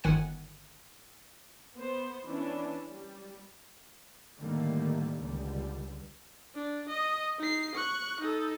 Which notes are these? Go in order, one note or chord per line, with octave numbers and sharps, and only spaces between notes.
G1 D#3 F#5 G#5
B3 C5
E3 C#4 D4
G3
A2 D3 D#3 G3 A3 A#3
C#2 D3 G3
D4
D#5
D#4 C7
C#6 F#6
D#4 A4